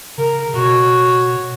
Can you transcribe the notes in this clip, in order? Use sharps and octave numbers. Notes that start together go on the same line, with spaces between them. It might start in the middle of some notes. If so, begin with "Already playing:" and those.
C#3 A#4
B2 F#4 C#5